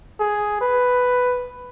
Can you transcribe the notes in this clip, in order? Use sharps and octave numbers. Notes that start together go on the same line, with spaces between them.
G#4
B4